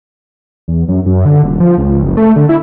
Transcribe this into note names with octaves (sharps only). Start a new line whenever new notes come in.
E2
F#2
F#2
D3
D#1
F3
C#2
F#1
A3
D3
E4